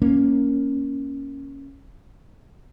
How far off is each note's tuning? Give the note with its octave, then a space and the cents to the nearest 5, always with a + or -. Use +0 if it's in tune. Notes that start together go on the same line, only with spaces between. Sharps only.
A#3 +0 C#4 -5